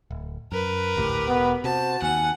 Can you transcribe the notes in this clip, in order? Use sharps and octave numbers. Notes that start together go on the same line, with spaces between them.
D1
F#2 A#4 B4
G#1 D2 A2 G4
E1 B3
C3 F#4 C5 A5
D#2 F#5 G#5